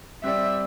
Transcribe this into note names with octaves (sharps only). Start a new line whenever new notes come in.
G3 C4 G4 D5 E5